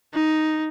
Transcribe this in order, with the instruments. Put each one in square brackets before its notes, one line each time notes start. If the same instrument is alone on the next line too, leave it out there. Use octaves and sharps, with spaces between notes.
[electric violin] D#4